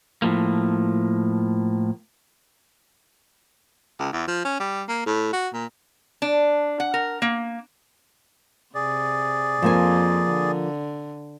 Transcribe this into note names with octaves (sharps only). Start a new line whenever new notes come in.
A2 F3 A#3
C#2
E2
F3
C#4
G3
A#3
A2
F#4
A#2
D4
F#5
A#4
A#3
C3 G#4 D5
F2 F3 A#3 G#5
D3